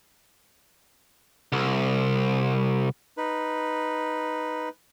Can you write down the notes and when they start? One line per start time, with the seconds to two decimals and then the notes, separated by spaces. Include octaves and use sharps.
1.52 C2
3.17 D#4 B4